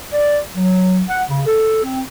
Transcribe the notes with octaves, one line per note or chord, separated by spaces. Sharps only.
D5
F#3
F#5
C#3
A4
C4